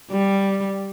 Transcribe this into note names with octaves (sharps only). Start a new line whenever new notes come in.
G3